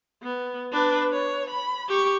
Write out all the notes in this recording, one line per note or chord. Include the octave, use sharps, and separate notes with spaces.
B3
D4 B4
C#5
B5
G4 C#6